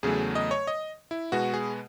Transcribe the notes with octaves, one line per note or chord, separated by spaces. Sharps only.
E2 C#3 F#3 A3 G#4
D#5
C#5
D#5
E4
B2 G#3 B3 F#4
G#4